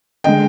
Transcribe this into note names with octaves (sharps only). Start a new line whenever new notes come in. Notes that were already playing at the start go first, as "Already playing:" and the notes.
D3 G#3 D#5 G5